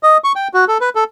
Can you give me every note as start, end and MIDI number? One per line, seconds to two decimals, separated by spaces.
0.03 0.17 75
0.24 0.32 85
0.36 0.48 79
0.54 0.65 66
0.68 0.78 69
0.81 0.89 71
0.95 1.04 69